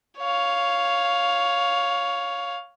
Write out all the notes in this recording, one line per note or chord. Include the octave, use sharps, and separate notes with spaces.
C#5 F5